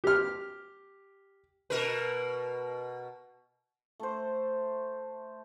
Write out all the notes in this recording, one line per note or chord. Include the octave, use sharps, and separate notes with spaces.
G4 F6
B2 A#4 B4
A3 A4 C5